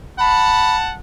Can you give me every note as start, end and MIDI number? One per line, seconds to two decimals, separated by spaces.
0.19 0.95 78
0.19 0.95 81
0.19 0.76 83